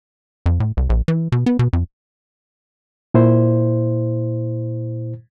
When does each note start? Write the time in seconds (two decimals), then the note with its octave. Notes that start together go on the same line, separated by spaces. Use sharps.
0.46 F2
0.60 A2
0.77 C2
0.89 A#1
1.08 E3
1.32 B2
1.46 B3
1.59 B2
1.73 F2
3.14 A#2 E4 C5